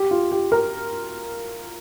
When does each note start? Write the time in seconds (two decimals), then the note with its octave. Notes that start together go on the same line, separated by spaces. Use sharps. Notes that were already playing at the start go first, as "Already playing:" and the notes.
Already playing: G4
0.11 F4
0.32 G4
0.52 A#4